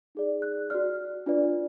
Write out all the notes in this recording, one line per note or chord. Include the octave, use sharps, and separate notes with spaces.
D#4 G#4 D5
F#6
F#4 D5 F6
D4 F4 B4 D5